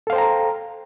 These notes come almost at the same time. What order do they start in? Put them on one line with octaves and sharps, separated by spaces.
A4 F5 C5 G5 A#5